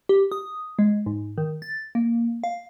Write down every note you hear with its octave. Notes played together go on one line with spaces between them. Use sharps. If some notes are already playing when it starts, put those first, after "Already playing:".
G4
D#6
G#3
G#2
D#3
A6
A#3
F5